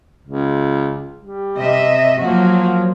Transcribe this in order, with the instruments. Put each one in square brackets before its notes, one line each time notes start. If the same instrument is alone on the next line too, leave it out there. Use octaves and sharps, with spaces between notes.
[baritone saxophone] C#2
G3
[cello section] C3 D#5 E5
[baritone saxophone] F3 [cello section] F#3 A#3 F#4